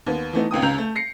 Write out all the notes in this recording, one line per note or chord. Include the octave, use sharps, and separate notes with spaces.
D#2 B3
E3 A3 B3 D#4
G#1 C#2 G5 D#6
C#2 C#3 A#5 G6 F7
A3
A#6 C7 C#7